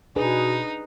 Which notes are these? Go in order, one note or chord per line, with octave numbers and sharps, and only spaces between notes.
B2 D4 D#4 G#4 B4